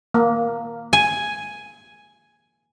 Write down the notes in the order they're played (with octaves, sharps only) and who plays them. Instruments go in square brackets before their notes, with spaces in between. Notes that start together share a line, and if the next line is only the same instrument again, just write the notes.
[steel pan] A#3
[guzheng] G#5